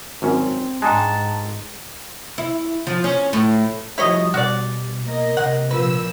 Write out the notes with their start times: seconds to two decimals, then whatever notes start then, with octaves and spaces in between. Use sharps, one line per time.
0.22 G#1 F#2 C4 C#4
0.82 G#2 G#3 D4 G5 A5 A#5 F#6
2.38 E4
2.87 F3
3.04 C#4
3.33 A2
3.98 F3 G3 E4 F#4 G#4 C#5 D#5
4.34 B2 F#4 D5
5.07 A#3 A#4 D#5
5.37 C3 F#5
5.71 A#2 F3 B4 E6